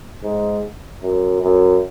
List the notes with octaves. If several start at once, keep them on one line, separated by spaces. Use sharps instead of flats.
G#2
F#2
F#2